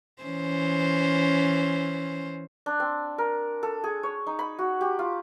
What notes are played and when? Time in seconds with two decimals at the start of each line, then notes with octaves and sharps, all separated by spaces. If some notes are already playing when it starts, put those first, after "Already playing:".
0.23 E3 C#4 C5
2.66 D4
2.80 C4
3.18 A#4
3.63 A4
3.84 G#4
4.03 C#5
4.27 D#4
4.39 B5
4.59 F#4
4.81 G4
4.99 F4